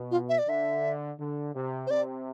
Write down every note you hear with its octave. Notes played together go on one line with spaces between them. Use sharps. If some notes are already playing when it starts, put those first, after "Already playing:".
Already playing: B2
F4
E5
D5
D3 E5
D3
C3
C5
C3 D5